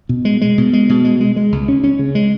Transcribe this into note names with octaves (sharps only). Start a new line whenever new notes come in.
B2
G#3
G#3
B2
G#3
B2
G#3
G#3
G#3
C#2
C#4
C#4
C#3
G#3